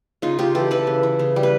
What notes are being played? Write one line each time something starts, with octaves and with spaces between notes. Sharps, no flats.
C#3 D#4 F4
C#3 F4 G4
E3 G4 A4
E3 A4 B4
C#3
E3
C#3
G3
B4